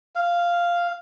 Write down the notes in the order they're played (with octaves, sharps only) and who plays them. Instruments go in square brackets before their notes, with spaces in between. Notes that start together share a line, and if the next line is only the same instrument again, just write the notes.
[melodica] F5